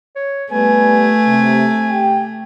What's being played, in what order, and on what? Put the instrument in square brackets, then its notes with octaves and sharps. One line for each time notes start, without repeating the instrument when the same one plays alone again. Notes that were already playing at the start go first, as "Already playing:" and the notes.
[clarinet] C#5
[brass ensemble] G3 B3 B4 [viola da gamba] A3 [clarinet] G#5
[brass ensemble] C3
G4 G5